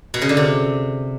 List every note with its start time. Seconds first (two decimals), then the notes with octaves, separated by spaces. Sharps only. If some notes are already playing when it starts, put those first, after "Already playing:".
0.14 B2
0.22 C#3
0.29 D3
0.37 C3